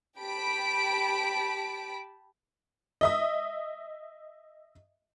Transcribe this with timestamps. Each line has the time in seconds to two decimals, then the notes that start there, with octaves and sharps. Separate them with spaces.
0.18 G4 G5 A5 B5 B6 D7
3.01 D#5 E5 D#6